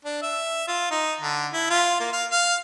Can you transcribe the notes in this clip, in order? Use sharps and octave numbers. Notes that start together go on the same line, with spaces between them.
D4
E5
F4
D#4
D3
E4
F4
A#3
F5
F5